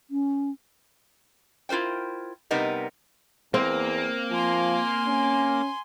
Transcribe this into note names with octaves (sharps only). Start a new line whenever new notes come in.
C#4
E4 F4 A#4 C5 G5
C3 G3 B3 D#4 A#4
E2 A#3 C4
F3 G#5 C6
C#4